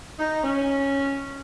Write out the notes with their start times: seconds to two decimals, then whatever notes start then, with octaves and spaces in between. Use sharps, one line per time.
0.19 D#4
0.44 C#4